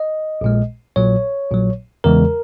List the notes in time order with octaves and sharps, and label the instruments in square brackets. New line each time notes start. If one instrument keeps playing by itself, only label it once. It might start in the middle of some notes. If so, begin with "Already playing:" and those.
Already playing: [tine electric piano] D#5
A#1 A#2 G#3
A#1 A#2 F#3 C#5
A#1 A#2 F#3
E2 C#3 E3 G#3 A#4